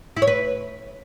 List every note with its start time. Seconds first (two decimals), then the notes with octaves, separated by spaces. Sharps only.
0.16 E4
0.22 C#5
0.27 B4